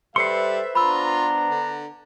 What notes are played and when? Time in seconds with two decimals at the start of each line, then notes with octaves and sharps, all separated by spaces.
0.16 G3 A4 B4 C5 E5 C6 C7 C#7
0.75 B3 D4 F4 A#5 B5 E6
1.50 D3